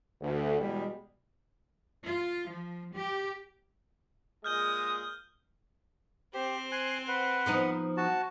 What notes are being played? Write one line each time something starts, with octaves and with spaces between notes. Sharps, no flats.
D2
E2 B2 G3 G#3
F4
F3
G4
A#2 G#3 D#6 F6 G6 G7
C4 G4 C5
G#5 C6 F#6
B4 F#5
F3 B3 D#4
F#4 A5